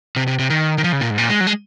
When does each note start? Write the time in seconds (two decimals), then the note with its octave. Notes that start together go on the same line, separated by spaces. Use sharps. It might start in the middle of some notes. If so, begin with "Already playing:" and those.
0.16 C3
0.27 C3
0.39 C3
0.50 D#3
0.78 D#3
0.84 F3
0.92 C#3
1.01 A#2
1.10 G#2
1.18 A#2
1.29 G#3
1.40 F#3
1.47 G#3